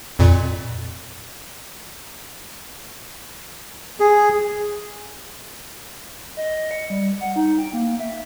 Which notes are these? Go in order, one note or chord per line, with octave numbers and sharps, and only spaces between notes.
F2 A#2
G#4
D#5
C#7
G3
F#5
D#4
G5
A#3
E5